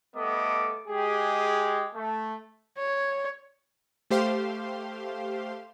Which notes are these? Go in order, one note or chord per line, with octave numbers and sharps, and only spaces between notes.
G3 A3 B3 A4 D#5 D6
G#3 G4 G#4
A3
C#5
A3 G4 C5 F5 C6